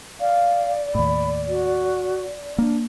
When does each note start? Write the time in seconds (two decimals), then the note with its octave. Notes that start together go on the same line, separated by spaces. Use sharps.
0.20 D5 F5
0.95 D#2 A2 B5
1.48 F#4
2.58 A#3 D4